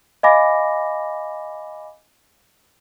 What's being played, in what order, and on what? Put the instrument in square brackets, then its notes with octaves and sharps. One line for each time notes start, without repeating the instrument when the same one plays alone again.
[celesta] D#5 F5 G#5 B5 D6 A#6